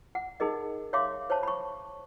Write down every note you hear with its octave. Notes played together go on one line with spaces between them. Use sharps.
F#5
D#4 G#4 A#4 D#5
C#5 E5 F5 C6 D6
C5 C#5 A5
B5 C#6